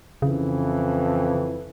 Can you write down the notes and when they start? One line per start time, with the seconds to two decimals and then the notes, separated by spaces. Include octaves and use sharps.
0.22 F2 C#3 E3